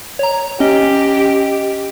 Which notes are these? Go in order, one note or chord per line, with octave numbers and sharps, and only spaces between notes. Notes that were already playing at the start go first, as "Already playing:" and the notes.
C#5 A#5
C#4 G4 D#5